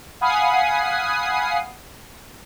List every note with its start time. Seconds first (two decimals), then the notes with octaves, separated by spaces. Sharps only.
0.21 F5 F#5 G#5 B5 D#6 C7